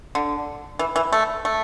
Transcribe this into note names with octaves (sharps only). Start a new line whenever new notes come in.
D3
E3
E3
A3
A3